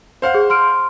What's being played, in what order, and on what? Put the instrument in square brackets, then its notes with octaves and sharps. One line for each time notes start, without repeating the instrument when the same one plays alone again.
[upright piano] C5 F5 F#5
[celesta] G#4
C6 F6 D7